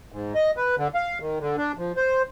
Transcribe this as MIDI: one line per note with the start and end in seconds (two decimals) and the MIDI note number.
0.12 0.33 44
0.35 0.51 75
0.57 0.75 71
0.78 0.88 50
0.95 1.18 77
1.21 1.38 51
1.40 1.56 50
1.57 1.72 62
1.78 1.92 53
1.97 2.22 72